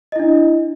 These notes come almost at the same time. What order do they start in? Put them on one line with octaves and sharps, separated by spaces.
D#5 E4 D4